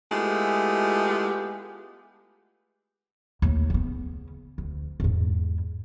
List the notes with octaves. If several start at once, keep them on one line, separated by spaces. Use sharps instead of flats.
G#3 A3 B3 E4 F4 G4
D#2 A3
C#3 B3
D2
E2 G#2